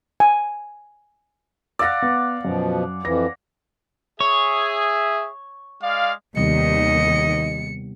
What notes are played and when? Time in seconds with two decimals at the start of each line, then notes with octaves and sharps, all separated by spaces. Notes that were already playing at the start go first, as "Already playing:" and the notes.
0.20 G#5
1.79 D5 F5 F#5 E6 A#6
2.02 B3
2.45 F#2 B2 F3
3.05 F2 E3 A#6
4.20 G#4 C#5 E5
5.83 G#3 D5 F5
6.36 D#2 C3 D#3 G3 B3 D#5 C#7